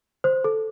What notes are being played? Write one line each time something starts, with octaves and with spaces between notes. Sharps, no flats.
C5
A4